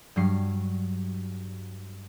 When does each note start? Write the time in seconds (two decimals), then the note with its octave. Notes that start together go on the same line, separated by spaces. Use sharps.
0.16 G2 F#3 G3 C7